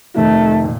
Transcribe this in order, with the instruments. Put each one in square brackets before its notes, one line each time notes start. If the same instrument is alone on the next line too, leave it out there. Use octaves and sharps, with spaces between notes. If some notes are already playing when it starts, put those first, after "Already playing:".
[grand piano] F2 C3 D#3 [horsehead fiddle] A3
[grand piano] A#2